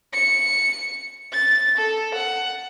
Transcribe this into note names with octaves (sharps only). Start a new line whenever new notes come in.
C#7
A6
A4
F#5